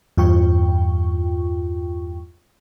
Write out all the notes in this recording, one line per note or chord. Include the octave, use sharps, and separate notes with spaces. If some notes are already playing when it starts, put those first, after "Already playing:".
E2 G2 F4 G5 C#6